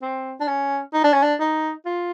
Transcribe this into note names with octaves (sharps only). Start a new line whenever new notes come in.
C4
D4
C#4
D#4
D4
C#4
D4
D#4
F4